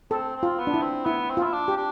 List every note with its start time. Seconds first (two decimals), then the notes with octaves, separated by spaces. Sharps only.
0.11 C4 A4
0.36 C4
0.43 F4
0.59 B3
0.67 D4
0.74 E4
0.82 C4
1.05 B3 E4
1.30 C4
1.37 F4
1.43 E4
1.53 D4
1.68 G4
1.77 D4